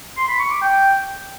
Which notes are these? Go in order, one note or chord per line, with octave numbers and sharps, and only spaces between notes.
C6
B5
C#6
D6
G5